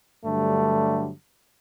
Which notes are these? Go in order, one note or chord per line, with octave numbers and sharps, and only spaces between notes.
G2 D3 F#3 G3 A3